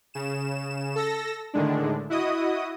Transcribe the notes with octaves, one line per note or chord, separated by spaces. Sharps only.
C#3 E7
A4 E6 A#6
A2 D3 D#3 G#3 D4
E4 F#4 D#5 D#6